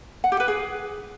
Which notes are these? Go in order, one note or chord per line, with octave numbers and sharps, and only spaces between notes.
F#5
G4
B4
G#4